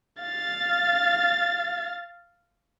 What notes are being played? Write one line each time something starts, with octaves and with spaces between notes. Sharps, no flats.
F5 A6